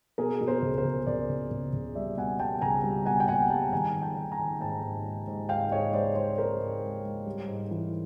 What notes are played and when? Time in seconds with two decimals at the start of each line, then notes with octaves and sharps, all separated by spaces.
0.18 B2 G#4 A#4
0.41 B2
0.47 A#4 C5
0.62 C#2
0.78 A#4 C5
0.85 C#2
1.07 C#2 C5 D5
1.30 C#2
1.51 C#2
1.73 C#2
1.95 G3 D5 E5
2.17 B2 F#5 G#5
2.40 G3 G5 A5
2.61 C#2 G#5 A#5
2.84 G3
3.05 B2 F#5 G#5
3.20 G5
3.28 B2 F#5 G#5
3.50 G3 G5 A5
3.73 D#3 G#5 A#5
3.95 D#3
4.02 G5 A5
4.16 D#3
4.32 G#5 A#5
4.39 D#3
4.61 G#2 G5 A5
4.83 G#2
5.05 G#3
5.27 G#2
5.49 G#2 F5 G5
5.72 G#2 C#5 D#5
5.93 G#3 C5 D5
6.15 G#3 C5 D5
6.38 G#2 A#4 C5
6.60 G#2
6.82 G#3
7.05 G#3
7.26 G3
7.48 G#2
7.71 E3